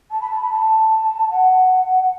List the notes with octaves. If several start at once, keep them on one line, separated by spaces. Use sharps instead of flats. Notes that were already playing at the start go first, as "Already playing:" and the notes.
A5
B5
A5
B5
A5
F#5